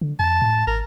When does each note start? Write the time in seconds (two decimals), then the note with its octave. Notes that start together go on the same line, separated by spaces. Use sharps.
0.01 D3
0.19 F2 A5
0.42 A2
0.67 G#1 A#4